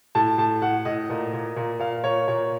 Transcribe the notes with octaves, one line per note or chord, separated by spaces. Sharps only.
A2 A5
A2 A5
A2 F#5
A2 D#5
A#2
A#2
A#2
A#2 F5
A#2 C#5
A#2 C#5